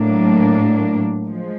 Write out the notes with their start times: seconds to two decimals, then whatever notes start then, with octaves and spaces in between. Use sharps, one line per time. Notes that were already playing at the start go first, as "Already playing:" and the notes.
Already playing: A2 F#3 A#3 D4
1.26 F3 G#3